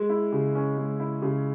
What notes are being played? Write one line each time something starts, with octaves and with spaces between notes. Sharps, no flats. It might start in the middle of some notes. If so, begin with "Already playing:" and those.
Already playing: G#3
E4
C#3
C#4
G#3
E4
C#3